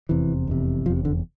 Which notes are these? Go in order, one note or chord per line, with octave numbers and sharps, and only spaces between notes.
F1 E2 C3 E3
F1 E2 C3
F1 E2 C3 F3
D3